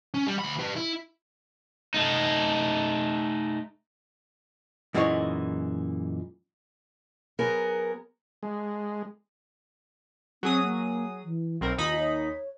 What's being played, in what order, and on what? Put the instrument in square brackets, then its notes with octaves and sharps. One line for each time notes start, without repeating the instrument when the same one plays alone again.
[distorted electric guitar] C#4
G3
D2 B5
G4 B4
E4
[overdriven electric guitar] A3 D#4
[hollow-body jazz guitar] F#2 A#2 E3 G#3 D#4 C#5
[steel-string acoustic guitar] F#3 B3 G#4 A#4
[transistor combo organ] G#3
[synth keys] F#3 G#4 D#6 [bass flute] C4
[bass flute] A#3
E3
[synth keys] B1 C4 A#4
[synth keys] D#2 D#4 B5 [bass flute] F4
[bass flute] C#5